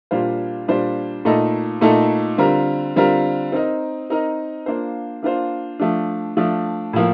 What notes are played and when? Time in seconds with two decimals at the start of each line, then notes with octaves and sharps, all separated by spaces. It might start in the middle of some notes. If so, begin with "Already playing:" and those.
0.11 A#2 G3 D4 F4 C5
0.68 A#2 G3 D4 F4 C5
1.25 A#2 A3 D#4 A4 D#5
1.81 A#2 A3 D#4 A4 D#5
2.38 D3 G3 C4 F4 A#4
2.96 D3 G3 C4 F4 A#4
3.52 C4 D#4 A#4 D#5
4.10 C4 D#4 A#4 D#5
4.66 A#3 D4 F4 C5
5.23 A#3 D4 F4 C5
5.79 F3 A3 D4
6.37 F3 A3 D4
6.93 A2 F3 A#3